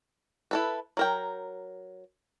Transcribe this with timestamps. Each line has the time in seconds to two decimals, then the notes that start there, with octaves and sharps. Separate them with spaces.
0.51 E4 A4 B4
0.97 F#3 A#4 G5